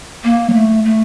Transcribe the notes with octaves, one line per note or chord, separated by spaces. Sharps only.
A#3
F#3
A3
A3